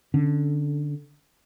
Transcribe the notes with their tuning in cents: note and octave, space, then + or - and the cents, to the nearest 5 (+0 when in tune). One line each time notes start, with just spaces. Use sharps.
D3 +0 C#4 +0